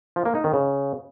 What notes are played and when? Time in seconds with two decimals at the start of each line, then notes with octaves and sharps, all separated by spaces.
0.16 F3
0.25 A#3
0.35 D#4
0.44 D#3
0.54 C#3